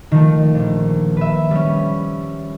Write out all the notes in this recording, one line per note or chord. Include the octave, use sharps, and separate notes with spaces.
D#3 F3 A3
A#1
B4 E5
G3 C#4